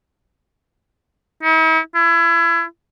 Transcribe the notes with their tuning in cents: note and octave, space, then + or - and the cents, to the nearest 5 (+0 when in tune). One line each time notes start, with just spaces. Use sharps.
E4 -45
E4 +30